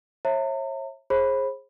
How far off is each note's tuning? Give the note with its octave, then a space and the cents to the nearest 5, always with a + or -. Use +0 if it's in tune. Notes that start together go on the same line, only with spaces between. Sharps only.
C#5 -35 E5 +0 A#5 -40
G#4 +0 C5 +35 B5 +0